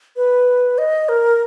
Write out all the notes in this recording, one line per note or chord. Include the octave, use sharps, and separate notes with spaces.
B4
D#5
A#4